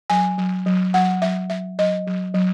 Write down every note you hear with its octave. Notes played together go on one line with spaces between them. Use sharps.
F#3 G#5
F#3
F#3
F#3 F#5
F#3 E5
F#3 E5
F#3 D#5
F#3
F#3